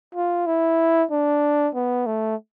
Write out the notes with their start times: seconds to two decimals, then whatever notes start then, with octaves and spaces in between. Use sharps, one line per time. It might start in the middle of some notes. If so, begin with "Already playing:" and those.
0.15 F4
0.46 E4
1.11 D4
1.75 B3
2.06 A3